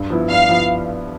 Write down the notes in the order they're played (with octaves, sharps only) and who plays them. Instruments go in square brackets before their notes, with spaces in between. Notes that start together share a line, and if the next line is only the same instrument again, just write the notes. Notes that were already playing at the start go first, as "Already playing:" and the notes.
Already playing: [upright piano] G2
F3 B3 E4
[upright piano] G2 [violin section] F5
[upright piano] F3 B3 E4